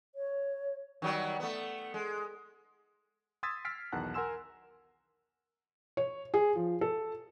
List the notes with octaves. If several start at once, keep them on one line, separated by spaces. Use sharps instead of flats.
C#5
D#3 F#3 G3
A3 B3
G#3
C6 D#6 E6 G#6 A6 B6
E6 F6 A6 B6 C7 D7
B1 E2 D#3 F#5 A5 F#6
A#4 F#5 G#5 C6 E6 E7
C#5
G#4
F3
A4